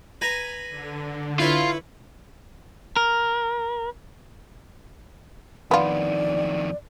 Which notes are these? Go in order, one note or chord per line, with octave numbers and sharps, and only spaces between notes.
B4 G#5 A#5
D3
E4 F4 B4 C#5
A#4
F2 D#3 B3 F4 D5